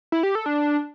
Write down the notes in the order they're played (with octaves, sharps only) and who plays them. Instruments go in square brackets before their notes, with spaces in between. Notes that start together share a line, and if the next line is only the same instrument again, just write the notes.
[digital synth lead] E4
G4
A4
D4